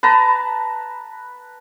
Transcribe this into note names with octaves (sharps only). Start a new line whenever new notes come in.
B4 A5 A#5